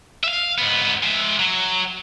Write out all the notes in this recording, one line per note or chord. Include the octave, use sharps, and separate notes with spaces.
E5 F5
G#2 B3
G#3 E5
F#3